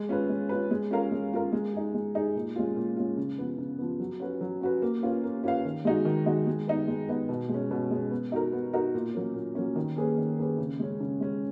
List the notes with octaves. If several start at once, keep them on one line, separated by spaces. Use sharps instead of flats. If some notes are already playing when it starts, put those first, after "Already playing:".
Already playing: G#3
C#4 F4 B4
G#3
C#4 F4 B4
G#3
C#4 F4 A#4 F5
G#3
C#4 F4 A#4 F5
G#3
D#4 G#4
G#3
D#4 G#4
A#2
G#3 C#4 F4
A#2
G#3 C#4 F4
C#3
F3 B3
C#3
F3 B3
F#3
C#4 F#4 B4
F#3
C#4 F#4 B4
A#3
C#4 F4 B4 F5
A#3
C#4 F4 B4 F5
D#3
G#3 D#4 F#4
D#3
G#3 D#4 F#4
G#3
B3 D#4
G#3
B3 D#4
B2
G#3 C#4
B2
G#3 C#4
B3
D#4 F#4 A#4
B3
D#4 F#4 A#4
A#2
F#3 A#3 C#4
A#2
F#3 A#3 C#4
D#3
A#3 C#4 G#4 B4
D#3
A#3 C#4 G#4 B4
C#3
G#3 C#4
C#3
G#3 C#4